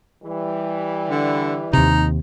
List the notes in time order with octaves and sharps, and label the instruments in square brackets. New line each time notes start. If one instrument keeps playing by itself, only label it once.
[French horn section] E3 G3
[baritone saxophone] D3
[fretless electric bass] D#2 C3 [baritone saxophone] D#4